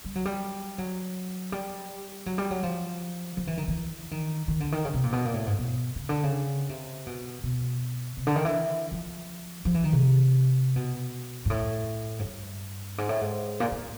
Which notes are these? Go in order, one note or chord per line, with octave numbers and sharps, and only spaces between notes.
G3
F#3
G3
F#3
G3
F#3
G3
F#3
F3
F3
E3
D#3
E3
D#3
D#3
D3
D#3
C#3
C3
A#2
B2
A#2
A2
G#2
B2
C#3
D3
C#3
C3
B2
B2
C3
D3
D#3
E3
F3
F3
E3
D#3
C3
B2
G#2
A2
G#2
G2
G#2
A2
G#2
A#2
A2